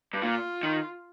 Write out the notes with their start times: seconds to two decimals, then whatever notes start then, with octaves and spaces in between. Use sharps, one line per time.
0.14 G2
0.22 A#2 F4
0.63 D#3